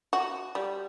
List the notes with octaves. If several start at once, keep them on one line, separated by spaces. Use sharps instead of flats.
F#4
G3